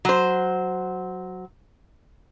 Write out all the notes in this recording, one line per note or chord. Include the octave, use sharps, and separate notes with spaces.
F#3 C5